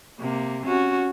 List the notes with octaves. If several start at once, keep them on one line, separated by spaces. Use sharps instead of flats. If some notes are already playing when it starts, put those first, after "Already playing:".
C3 A#3
C#4 F#4